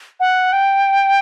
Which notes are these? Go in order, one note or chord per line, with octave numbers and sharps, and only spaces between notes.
F#5
G5